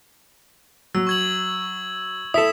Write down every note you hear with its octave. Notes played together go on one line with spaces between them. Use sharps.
F#3 E6
C#6 G#6 F#7
E4 A4 D#6 B6 E7